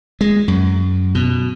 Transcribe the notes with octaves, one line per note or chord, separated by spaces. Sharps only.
G#3
F#2
B2